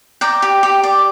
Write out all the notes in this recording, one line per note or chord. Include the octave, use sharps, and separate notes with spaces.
D5 G5 A#5
G4
G4
D5